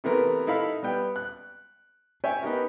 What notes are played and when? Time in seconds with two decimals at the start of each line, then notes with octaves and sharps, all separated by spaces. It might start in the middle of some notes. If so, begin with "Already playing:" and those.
0.04 C3 E3 A3 B3 A#4
0.47 D#4 E4 A4 F5 B5
0.83 G3 B3 G5
1.16 F#6
2.24 C#5 E5 G5 G#5
2.43 B3 D#4 G4 A#4